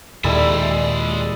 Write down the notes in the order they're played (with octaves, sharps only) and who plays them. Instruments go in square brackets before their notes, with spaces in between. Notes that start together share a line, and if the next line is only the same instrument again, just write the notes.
[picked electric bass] D#2 [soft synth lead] A#2 [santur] G3 E4 A4 [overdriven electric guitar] G#3 E5